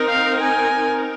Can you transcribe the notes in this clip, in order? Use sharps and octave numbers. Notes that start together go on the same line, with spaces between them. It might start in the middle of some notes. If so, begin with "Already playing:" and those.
Already playing: C4 D#4 A#4
F5
G#5